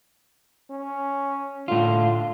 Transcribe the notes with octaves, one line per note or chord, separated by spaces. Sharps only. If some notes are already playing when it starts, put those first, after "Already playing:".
C#4
A2 D3 F4